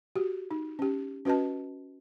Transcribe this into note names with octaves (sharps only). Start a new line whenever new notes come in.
F#4 G4
D#4
C#4 G4
C#4 F#4 B4 D#5 A5